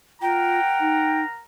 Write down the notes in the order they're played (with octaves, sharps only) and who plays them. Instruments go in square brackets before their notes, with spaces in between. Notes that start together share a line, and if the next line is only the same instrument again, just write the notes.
[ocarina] F4 [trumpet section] A#4 F#5 A#5 [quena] G5
[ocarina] D#4